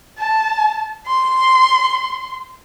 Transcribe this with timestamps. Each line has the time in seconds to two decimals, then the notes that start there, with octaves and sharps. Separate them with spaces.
0.18 A5
1.07 C6